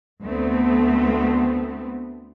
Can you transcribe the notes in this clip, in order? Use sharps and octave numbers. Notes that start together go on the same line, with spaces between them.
D2 A3 B3 C4